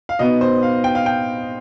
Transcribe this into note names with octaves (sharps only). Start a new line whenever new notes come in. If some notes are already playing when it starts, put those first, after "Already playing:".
F5
B2 B3 D#4 D#5
C5
F5
G5
F5
G5